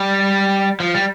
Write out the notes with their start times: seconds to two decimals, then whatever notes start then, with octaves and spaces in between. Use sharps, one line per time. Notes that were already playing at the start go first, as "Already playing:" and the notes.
Already playing: G3
0.80 F3
0.95 G3